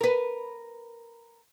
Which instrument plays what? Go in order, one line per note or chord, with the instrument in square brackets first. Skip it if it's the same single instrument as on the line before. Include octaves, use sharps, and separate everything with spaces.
[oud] A#4 B4